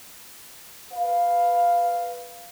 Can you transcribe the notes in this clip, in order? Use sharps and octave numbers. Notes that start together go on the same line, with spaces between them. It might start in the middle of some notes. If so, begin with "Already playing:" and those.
B4 F5